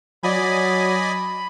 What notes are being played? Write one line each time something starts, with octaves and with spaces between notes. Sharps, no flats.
F#3 D5 D#5 G#5 B5